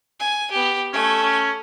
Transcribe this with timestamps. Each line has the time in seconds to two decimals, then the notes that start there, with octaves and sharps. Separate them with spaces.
0.20 G#5
0.51 B3 G4
0.93 A3 C#4 G#5
1.23 C#4